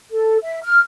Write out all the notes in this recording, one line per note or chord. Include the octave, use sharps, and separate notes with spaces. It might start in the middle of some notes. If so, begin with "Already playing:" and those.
A4
E5
F6